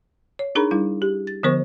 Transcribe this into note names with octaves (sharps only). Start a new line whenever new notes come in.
C#5
D4 D#4 G#4 A#4 A#5 B5
G3 D4 E4
G4
A6
D3 F3 B3 A#4 C5 C#6